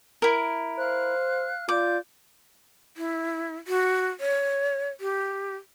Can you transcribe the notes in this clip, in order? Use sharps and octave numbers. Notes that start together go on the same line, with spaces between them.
E4 A#4
C5 F5 F6 F#6
F4 D5 D6 G6
E4
F#4
C#5
G4